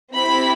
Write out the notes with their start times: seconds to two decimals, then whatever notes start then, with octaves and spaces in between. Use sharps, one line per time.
0.13 C4 E4 G4 B5